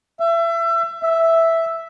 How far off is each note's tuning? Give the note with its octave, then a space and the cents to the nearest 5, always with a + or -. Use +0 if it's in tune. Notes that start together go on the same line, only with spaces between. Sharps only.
E5 +30
E5 +0